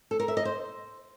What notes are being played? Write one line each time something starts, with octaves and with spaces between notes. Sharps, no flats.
A4
A#4
E5
D#5
C5